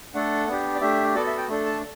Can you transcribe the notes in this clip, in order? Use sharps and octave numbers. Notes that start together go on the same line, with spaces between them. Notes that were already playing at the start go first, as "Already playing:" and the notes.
A3 D4 A4 F#5
B3 D4 G4
D5
A3 D4 G4 E5
B3 F#4 A4 D5
E5
G5
A3 D4 A4
A5